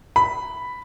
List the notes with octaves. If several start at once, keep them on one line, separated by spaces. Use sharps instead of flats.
B5